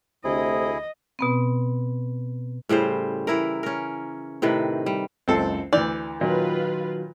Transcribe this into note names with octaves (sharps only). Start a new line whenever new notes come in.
D2 C3 E4 G#4 D#5
B2 B3 C4
A2 C#3 G3 C5
E3 E4 A#4
C#4 A#4
A2 C3 D#3 B4
G3
F#1 C#2 C4 A4 C7
D2 E3 D5 G6 F7
A#2 D#3 F#3 F4 B4